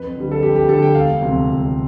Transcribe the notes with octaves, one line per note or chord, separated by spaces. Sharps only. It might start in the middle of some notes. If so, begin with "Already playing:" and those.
Already playing: F2 B4
D3 G3
A4
F2 G4
G4
D3 G3 A4
G5
E1 F5
D2 C3 F3 C4
E1